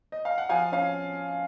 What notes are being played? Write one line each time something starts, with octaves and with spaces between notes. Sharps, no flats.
D#5
F5
F#5
F3 F5 G#5
C#4 F5